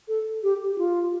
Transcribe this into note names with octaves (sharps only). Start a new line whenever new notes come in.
A4
G4
G4
F4